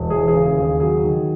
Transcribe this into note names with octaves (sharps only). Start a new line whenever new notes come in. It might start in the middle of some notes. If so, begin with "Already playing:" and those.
Already playing: E1
E3 G#4
G#4
C#3
G#4
D#2
G#4
F#3 G#4
D#3